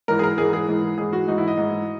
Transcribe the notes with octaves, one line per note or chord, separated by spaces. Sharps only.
G#2 E3 A#4
G#4
A#4
G#2 E3 G#4
G#4
G#2 E3
G#2 E3 G#4
F#4
G#2 E3 D#4
E4
D#5
G#2 E3